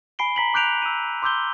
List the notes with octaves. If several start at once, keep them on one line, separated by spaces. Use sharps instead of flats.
G#5 B5 C7 D7 G7
A#5 B6 F#7
D6 F#6 G6 D7 F7
E6 D#7
C6 D6 E6 G6 G7